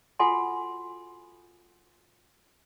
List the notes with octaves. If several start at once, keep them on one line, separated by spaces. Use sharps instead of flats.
F4 F#4 A4 F#5 G#5 C6